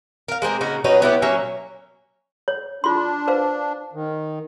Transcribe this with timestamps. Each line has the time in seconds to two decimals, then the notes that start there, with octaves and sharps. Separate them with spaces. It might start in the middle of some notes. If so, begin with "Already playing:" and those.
0.28 A#4 F5
0.42 G#3 A#3 C4 G#4
0.61 C#3 A#3 D#4 F#4
0.84 F#3 B3 C#4 D#4
1.02 B3 E4 G4
1.22 F#3 A#3 C#4 E5
2.48 C#5
2.84 D4 F4 C6
3.28 B4 C5 F5
3.93 D#3